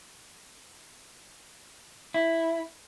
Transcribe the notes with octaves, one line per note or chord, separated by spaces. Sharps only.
E4